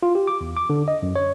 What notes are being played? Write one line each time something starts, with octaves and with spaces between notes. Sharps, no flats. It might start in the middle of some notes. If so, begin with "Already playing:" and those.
F4
G4
D6
E2
D6
D3
D#5
F#2
C#5